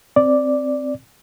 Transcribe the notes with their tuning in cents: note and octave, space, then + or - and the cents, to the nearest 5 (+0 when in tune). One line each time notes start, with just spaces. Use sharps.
C4 +0 D5 +0